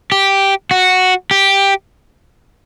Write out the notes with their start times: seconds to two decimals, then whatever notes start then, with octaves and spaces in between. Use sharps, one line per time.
0.12 G4
0.71 F#4
1.31 G4